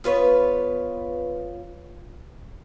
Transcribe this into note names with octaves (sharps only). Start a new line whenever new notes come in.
B3 F4 B4 C#5